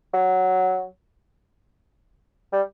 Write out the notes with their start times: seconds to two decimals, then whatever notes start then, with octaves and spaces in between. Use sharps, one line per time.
0.14 F#3
2.53 G3